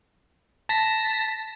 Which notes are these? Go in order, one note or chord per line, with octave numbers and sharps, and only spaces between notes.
A5 A#6 B6